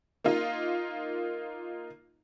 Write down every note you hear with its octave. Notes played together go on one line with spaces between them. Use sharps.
A#3 D#4 F4